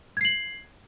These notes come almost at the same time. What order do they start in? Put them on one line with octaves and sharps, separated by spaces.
G#6 C7 F#7